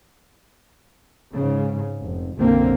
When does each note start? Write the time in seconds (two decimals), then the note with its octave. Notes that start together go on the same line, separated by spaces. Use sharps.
1.33 G#2 C#3
2.01 F1
2.36 F#1 B1 D3 A#3 C4